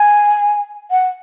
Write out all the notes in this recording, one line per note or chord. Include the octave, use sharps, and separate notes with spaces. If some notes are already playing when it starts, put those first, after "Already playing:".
Already playing: G#5
F#5